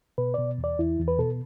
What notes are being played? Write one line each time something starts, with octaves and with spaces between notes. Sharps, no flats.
B2 B4
B2 D5
E2
D5
E2 E4
E2
B4
B2 A4